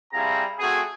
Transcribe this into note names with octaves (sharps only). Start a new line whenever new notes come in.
G3 C4 E4 G#4 F5 A#5
A3 C4 F#4 G#4